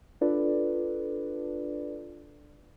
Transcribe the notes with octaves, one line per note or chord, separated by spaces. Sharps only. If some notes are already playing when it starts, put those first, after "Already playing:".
D4 F4 A4 B4 D5